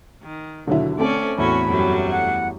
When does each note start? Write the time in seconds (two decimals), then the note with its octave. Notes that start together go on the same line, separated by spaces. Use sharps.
0.23 D#3
0.67 D#2 B2 D3 F#3 E4
0.99 A3 C4 C#4 E4 A4 D5
1.38 E2 A2 C#4 E4 F#4 B5
1.68 F#2 F#3 G3
2.11 F#5